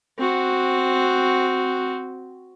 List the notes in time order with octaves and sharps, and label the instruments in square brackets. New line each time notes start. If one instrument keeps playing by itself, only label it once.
[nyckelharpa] C4 F#4